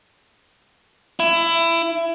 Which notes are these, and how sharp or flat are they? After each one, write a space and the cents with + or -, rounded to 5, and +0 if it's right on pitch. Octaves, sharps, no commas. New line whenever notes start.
E4 +20